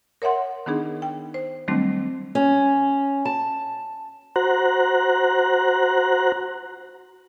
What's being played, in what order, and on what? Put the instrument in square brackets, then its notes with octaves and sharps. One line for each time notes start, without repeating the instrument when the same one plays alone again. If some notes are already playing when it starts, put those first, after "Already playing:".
[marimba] A#4 C#5 E5 F#5 C6
D#3 B3 D4 D#4 G#4
G5
C5
D#3 F#3 G3 A3 C4 D4
[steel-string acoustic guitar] C#4
A5
[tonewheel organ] F#4 C5 A#5 F#6